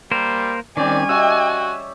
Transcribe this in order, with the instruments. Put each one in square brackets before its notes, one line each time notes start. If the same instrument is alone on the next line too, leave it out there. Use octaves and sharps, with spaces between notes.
[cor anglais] G3 [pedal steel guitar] A#3 A#4 C5
[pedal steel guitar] D#3 C4 [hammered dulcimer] G3 C#4 [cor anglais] D5 [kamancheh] G#5
[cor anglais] F#4 [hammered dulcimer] G4 D#5 E5 [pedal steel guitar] E6